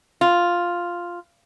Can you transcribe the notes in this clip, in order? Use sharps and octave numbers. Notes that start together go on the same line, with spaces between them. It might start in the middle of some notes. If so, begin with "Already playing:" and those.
F4